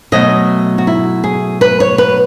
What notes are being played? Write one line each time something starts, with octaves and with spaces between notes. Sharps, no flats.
B2 F#3 A3 D#5
F#4
E4
G#4
B4
C#5
B4